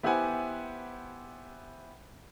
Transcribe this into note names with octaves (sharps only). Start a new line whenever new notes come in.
B3 E4 G4 C5 F#5 G#5